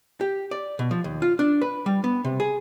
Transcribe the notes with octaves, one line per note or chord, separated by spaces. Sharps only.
G4
D5
B2
F3
D#2
F4
D4
B4
G3
B3
C3
G#4